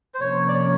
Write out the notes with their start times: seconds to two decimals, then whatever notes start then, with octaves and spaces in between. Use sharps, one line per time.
0.14 C5
0.21 C3 F3 A#3 C#4 C#5
0.48 D5
0.54 C#5